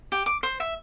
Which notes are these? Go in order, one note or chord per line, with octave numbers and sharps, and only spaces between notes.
G4
D6
C5
E5